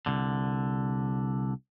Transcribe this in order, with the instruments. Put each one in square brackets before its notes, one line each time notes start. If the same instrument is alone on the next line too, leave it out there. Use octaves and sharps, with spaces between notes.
[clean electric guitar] C2 D3